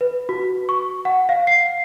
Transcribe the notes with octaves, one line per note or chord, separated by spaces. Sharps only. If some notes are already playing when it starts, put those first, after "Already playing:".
B4
F#4
C#6
F#5
F5
C7